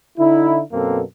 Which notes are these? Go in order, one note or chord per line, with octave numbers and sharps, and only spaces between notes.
D3 D#4 E4
F#2 B2 A#3 C4 A4